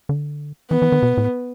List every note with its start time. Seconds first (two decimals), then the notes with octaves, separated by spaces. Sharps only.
0.09 D3
0.70 E3 B3
0.82 E3
0.92 D#3
1.03 B2
1.17 A2